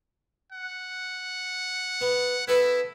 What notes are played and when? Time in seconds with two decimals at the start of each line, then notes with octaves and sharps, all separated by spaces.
0.52 F#5
2.01 B3
2.48 B3 E4 A4 B4